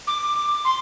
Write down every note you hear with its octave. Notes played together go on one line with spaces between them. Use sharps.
D6
C6